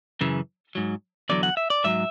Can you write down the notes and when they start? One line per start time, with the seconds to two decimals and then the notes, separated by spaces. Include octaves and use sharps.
0.21 F#2 C#3 E3
0.75 G#2 F#3
1.29 E2 D3 F#3 D5
1.43 F#5
1.57 E5
1.70 D5
1.84 G#2 F#3 E5